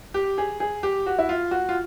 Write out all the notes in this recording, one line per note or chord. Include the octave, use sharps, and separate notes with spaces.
G4
G#4
G#4
G4
F#4
E4
F4
F#4
F4